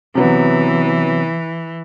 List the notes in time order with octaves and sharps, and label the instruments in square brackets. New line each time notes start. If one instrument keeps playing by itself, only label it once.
[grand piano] C3 F#3 B3 [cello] E3